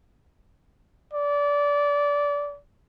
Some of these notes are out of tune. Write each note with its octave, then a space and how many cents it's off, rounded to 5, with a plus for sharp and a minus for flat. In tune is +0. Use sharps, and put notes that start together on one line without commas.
D5 -25